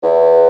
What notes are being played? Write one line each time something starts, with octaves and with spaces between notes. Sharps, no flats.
E2